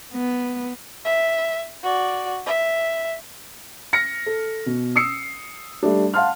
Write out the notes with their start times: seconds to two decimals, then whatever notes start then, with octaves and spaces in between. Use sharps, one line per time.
0.14 B3
1.06 E5
1.83 F#4 D5
2.47 E5
3.93 F6 A#6 C#7
4.26 A4
4.66 B2
4.96 D#6 E6 C7 C#7
5.83 G3 A3 D4
6.14 F5 F#5 A5 C6 F6